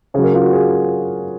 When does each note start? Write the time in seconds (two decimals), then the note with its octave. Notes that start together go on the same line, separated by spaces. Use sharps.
0.14 C#3 G#4
0.18 F#3
0.24 A#4
0.34 F4
0.44 F#4
0.53 G#4